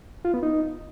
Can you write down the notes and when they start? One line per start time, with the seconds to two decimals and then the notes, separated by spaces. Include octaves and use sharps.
0.25 F4
0.34 B3
0.43 D#4